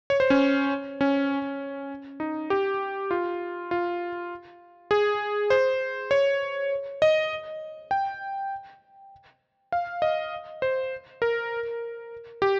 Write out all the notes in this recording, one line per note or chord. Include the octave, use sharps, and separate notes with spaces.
C#5
C5
C#4
C#4
D#4
G4
F4
F4
G#4
C5
C#5
D#5
G5
F5
D#5
C5
A#4
G4